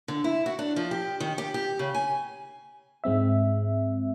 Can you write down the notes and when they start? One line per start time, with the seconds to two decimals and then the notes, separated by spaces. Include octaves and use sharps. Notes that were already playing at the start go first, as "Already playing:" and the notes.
0.08 D3
0.24 E4
0.46 F#4
0.59 D4
0.76 F3
0.91 G4
1.20 D#3
1.38 G4
1.54 G4
1.79 C#3
1.95 G#5
3.04 G#2 G#3 C4 E5